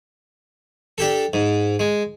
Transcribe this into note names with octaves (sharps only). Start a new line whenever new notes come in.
D4 G4 A4
G#2
G#3